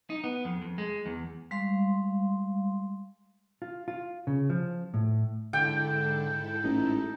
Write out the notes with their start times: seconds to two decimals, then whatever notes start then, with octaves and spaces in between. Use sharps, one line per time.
0.10 D#4
0.24 B3
0.45 F2
0.62 F2
0.78 G#3
1.06 E2
1.51 G3 G#3 F5 C6
3.62 F4
3.88 F4
4.27 C#3
4.50 F3
4.94 A2
5.53 G#2 D3 E4 A4 G5
6.64 A1 D#4